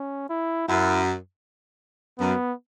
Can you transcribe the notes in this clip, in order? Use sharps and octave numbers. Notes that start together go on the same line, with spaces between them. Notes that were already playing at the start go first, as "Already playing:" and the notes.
Already playing: C#4
E4
F#2 E4
F#2 B3